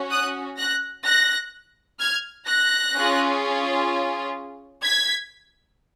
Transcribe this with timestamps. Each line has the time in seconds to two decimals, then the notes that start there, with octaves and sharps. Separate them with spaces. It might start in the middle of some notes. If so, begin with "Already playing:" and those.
Already playing: C#4 F#4
0.10 D#6 F#6
0.57 F#6 A#6
1.05 F#6 A#6
1.99 F6 G#6
2.46 F#6 A#6
2.94 C#4 F4 G#4
4.83 G#6 B6